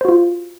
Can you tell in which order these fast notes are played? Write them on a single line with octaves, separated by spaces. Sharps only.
C5 F#4 F4